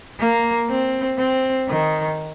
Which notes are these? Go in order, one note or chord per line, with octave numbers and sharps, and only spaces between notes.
A#3
C4
C4
D#3